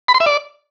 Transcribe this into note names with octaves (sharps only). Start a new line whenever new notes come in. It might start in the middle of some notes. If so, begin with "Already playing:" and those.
B5
C6
E5
D5